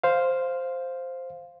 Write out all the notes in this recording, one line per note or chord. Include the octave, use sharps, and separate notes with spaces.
C5 F5